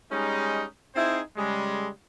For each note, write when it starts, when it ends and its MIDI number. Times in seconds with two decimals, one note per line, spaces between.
0.10 0.64 55
0.10 0.64 56
0.10 0.64 61
0.10 0.64 63
0.95 1.20 60
0.95 1.20 63
0.95 1.20 64
0.95 1.20 68
0.95 1.20 72
1.36 1.88 49
1.36 1.88 55
1.36 1.88 56